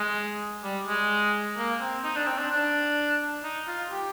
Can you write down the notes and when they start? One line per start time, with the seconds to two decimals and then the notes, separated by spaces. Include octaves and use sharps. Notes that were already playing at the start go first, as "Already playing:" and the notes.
Already playing: G#3
0.63 G3
0.87 G#3
1.58 A#3
1.81 C4
2.04 D#4
2.16 D4
2.27 C4
2.38 D4
2.51 D4
3.44 D#4
3.67 F4
3.91 G4